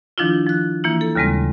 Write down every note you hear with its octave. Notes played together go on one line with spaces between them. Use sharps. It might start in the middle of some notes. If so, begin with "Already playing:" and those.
D#3 F3 D4 E4 F4
F3 F#6
E3 A#3 E4
A4
D#2 C#3 G3 G#3 C4